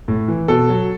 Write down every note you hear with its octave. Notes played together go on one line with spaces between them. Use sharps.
A2
E3
B2 A4
F#3